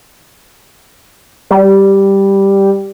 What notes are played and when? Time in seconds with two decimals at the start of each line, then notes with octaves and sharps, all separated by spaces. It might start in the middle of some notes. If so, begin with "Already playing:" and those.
1.51 G3